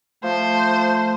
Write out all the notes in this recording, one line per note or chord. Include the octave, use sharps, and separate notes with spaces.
F3 A3 C5